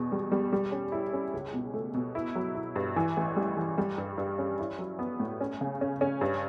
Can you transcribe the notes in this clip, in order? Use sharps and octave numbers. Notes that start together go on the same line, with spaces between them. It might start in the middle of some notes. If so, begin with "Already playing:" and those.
Already playing: E2 B2
G3
G3
G3
C#4
E4
C#4
C#2
B2
A3
B2
E4
F#3
E4
G2
E3
A1
G3
E3
G3
G2
G2
C#4
E4
F#3
B3
A2
C#4
C#3
C#4
C#4
G2